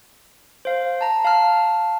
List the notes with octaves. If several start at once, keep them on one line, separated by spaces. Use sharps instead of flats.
C5 F5
A5 A#5
F5 A5 F6